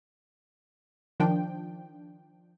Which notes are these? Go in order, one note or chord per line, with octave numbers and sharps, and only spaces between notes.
D#3 F3 D4 G5